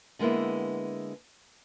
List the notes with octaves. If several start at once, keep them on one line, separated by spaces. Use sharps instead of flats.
D3 G#3 A#3 B3 E4